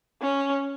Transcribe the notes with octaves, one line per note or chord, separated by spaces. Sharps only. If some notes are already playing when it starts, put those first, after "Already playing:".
C#4